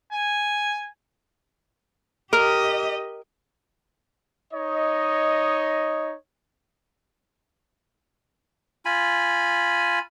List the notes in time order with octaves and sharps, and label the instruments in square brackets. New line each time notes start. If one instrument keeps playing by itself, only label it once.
[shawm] G#5
[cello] G4 D#5 [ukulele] A#4
[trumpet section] D#4 C#5 D#5
[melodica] F4 G#5 B5